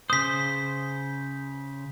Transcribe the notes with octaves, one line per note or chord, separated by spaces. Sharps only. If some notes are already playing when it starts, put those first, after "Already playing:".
C#3 C5 D#6 B6